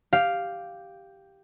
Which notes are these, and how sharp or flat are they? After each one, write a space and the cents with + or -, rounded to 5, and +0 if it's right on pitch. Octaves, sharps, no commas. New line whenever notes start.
G4 +0 F5 +0